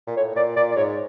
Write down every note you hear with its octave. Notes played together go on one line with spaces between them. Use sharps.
A#2
A2 C#5
A#2 D5
A#2 D5
D5
G#2 C#5